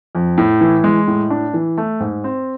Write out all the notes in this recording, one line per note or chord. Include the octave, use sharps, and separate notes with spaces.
F2
A2
E3
G#3
A2
D4
E3
A3
G#2
C4